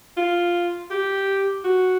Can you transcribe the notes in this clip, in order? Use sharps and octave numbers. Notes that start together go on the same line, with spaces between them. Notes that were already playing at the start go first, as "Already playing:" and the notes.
F4
G4
F#4